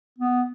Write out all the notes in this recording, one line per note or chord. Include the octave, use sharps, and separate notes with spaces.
B3